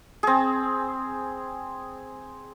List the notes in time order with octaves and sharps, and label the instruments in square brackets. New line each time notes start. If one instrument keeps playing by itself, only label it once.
[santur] C4 G#4